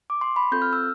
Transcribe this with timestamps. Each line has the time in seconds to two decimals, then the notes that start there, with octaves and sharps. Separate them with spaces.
0.10 D6
0.21 C6
0.36 B5
0.52 C4 F4 A4 G6
0.62 F6
0.73 E6